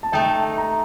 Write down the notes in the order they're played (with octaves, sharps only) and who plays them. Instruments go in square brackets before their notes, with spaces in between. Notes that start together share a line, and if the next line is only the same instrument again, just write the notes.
[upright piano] A5
[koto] A3 D#4 A4 [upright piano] G5
[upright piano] A#5